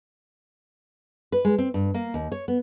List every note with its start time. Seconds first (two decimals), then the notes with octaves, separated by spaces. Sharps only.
1.32 B4
1.45 G#3
1.58 C4
1.74 G2
1.94 A#3
2.14 D#2
2.32 C#5
2.48 B3